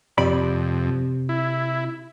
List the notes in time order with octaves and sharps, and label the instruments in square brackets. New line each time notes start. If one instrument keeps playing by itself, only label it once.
[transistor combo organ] F2 [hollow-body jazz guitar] C3 D5 B5
[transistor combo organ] E4